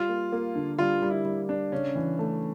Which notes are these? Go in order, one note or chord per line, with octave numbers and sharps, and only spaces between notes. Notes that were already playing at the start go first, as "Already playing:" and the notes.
Already playing: G3 F4
A#3
A#3
D3
G3 F4
G3
E4
G3
D4
C#3 C#4
E3
A3